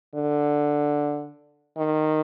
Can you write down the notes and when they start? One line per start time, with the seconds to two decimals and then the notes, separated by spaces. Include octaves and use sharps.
0.15 D3
1.77 D#3